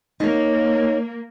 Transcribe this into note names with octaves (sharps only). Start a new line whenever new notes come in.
A#3 D#4 C#5